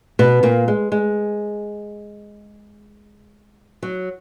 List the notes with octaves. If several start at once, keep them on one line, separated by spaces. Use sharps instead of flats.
B2 B3
A#2 A#3
G#3
G#3
F#3